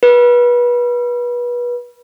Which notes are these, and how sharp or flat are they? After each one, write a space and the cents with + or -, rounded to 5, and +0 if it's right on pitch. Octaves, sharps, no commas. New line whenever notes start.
B4 -30